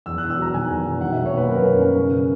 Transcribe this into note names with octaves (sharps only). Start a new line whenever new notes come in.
E2 E6
E1 F#6
E6
F#3 A#5
D#3 G#5
E2
E1
D#3 F#5
D#3 E5
C#5
A#3 B4
F#2 A#4
C#4
C#4
C#3